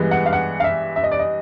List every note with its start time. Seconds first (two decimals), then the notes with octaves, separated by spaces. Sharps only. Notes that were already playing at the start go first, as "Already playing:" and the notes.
Already playing: G2 E3 G#3 B3
0.11 F#5
0.26 F5
0.33 F#5
0.60 F5
0.64 E5
0.96 E5
1.03 D#5
1.12 D5
1.19 D#5